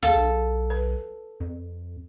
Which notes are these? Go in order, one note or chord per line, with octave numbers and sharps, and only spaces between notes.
D#2 G#4 A4 F5
B1
B4
F2